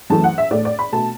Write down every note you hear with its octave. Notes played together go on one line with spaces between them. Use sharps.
F#2 E3 A3 A5
F#5
E5
A2 A3 D5
D5
B5
B2 A3 A5